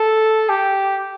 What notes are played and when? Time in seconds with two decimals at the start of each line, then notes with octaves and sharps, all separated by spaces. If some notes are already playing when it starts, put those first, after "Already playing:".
Already playing: A4
0.49 G4